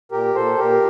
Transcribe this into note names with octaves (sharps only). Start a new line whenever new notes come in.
A#2 G4 A#4
A#2 A4 C5
A#2 G4 A#4